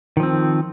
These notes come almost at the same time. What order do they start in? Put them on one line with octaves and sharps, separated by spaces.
D#3 F3 C4